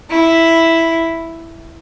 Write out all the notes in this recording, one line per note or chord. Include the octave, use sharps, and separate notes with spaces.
E4